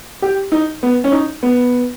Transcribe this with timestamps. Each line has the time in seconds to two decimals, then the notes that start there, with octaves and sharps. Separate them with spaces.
0.22 G4
0.52 D#4
0.83 B3
1.04 C#4
1.12 D#4
1.43 B3